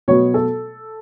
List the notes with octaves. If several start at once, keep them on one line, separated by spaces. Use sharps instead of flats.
B2 F#3 B3 C#5
A4